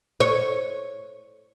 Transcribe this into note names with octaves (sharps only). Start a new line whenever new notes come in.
C#5